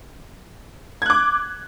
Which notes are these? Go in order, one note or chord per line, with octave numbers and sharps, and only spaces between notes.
D6 F#6 G#6